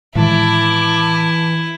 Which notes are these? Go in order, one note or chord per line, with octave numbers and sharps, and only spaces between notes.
A2 D#3 E3 G#3 E4 A5 D6